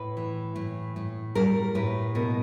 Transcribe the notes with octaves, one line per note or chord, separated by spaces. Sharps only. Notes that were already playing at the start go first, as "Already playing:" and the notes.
Already playing: A2 B4
E3
A2
A2
G3 A#4
A2 B4
B2 A#4